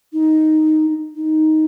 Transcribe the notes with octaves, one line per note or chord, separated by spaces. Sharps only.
D#4
D#4